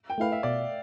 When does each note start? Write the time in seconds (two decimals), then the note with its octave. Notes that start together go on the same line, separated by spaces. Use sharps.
0.10 G5
0.18 A3 E4 B4 F5
0.32 E5
0.43 B2 D5